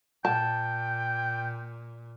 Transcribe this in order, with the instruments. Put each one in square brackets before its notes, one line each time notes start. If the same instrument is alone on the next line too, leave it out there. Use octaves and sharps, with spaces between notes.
[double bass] A#2 [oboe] G5 [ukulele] A5